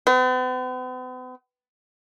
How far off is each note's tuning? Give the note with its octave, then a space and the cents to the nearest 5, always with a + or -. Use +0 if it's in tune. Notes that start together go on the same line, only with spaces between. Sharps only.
B3 +45